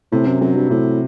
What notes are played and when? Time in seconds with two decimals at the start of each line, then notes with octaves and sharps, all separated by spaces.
0.12 A2 C3
0.27 F#2
0.41 F#2 F#3
0.56 G2
0.70 A2 C3